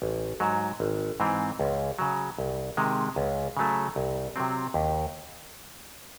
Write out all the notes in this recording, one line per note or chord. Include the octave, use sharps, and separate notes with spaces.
A1
G#2 F#3
G#1
G#2 E3 C4
C#2
C#3 F#3
C2
C3 D#3 G#3
C#2
C#3 F#3 A3
C2
C3 F#3 C4
D#2